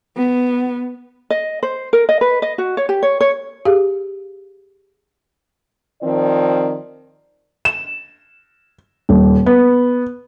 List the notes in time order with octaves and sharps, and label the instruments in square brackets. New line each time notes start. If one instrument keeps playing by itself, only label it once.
[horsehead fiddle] B3
[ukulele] D#5
C5
A#4
D#5
B4
D#5
F#4
C#5
G4
C#5
C#5
[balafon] G4 G#4 F5
[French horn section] D#3 F3 C4 D5
[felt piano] E7
D#1
B3